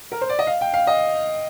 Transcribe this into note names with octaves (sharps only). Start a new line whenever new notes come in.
A#4
C5
D5
D#5
F5
G5
F5
D#5